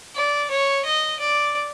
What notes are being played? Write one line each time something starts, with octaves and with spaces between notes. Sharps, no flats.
D5
C#5
D#5
D5